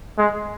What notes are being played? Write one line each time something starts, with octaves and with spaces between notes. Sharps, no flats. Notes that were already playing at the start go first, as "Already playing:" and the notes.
G#3